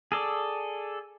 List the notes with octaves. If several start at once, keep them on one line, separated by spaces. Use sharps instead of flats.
G#4 A4 D5